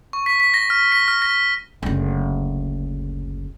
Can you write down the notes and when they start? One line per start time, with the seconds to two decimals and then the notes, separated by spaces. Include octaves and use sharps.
0.13 C#6
0.26 B6
0.40 B6
0.54 A#6
0.70 F6
0.92 B6
1.08 F6
1.22 A#6
1.83 F#1 D2